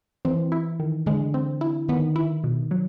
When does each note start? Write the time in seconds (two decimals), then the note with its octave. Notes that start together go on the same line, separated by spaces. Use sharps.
0.25 E3 C4
0.52 E4
0.80 D#3
1.06 D3 G#3
1.34 C4
1.61 E4
1.89 D#3 B3
2.16 E4
2.44 B2
2.71 F#3